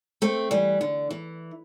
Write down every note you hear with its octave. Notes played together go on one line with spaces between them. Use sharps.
A3 C4
E3 G3
D3
E3